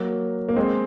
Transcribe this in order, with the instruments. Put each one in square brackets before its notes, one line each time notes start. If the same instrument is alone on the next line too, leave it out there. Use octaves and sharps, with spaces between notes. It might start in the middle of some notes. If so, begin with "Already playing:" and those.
Already playing: [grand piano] F#3 A#3
A#3
G#3 C4